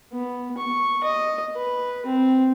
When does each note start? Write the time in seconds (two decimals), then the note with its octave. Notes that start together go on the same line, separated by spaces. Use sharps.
0.13 B3
0.58 C#6
1.04 D#5
1.56 B4
2.06 C4